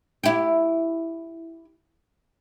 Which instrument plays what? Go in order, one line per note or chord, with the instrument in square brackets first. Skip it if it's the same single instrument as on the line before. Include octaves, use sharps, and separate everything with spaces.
[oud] E4 G4